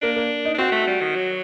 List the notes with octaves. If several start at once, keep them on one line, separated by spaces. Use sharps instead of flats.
A#3 D4
A#3
D#4
D4
C4 F#4
A3
G3
D#3
F#3